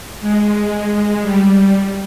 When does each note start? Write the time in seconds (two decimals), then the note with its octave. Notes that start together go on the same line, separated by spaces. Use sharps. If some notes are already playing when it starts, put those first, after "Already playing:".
0.21 G#3
1.22 G3